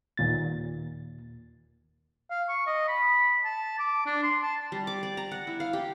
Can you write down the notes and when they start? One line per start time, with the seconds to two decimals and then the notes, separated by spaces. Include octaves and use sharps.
0.17 D#2 A#2 A6
2.31 F5
2.49 C#6
2.67 D#5
2.88 B5
3.44 A5
3.79 D6
4.06 D4
4.23 C6
4.42 A5
4.72 G3
4.87 D6
5.03 D5
5.17 A#5
5.31 F#5
5.47 E4
5.60 F5
5.73 G4